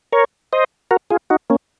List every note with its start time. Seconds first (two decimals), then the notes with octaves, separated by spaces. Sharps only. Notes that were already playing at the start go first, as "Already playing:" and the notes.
0.12 A#4 C#5
0.53 C5 D#5
0.91 F#4 A#4
1.11 F4 G#4
1.30 D#4 F#4
1.50 A#3 C#4